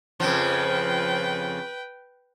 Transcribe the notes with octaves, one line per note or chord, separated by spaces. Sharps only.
F2 C#3 F3 B4 G5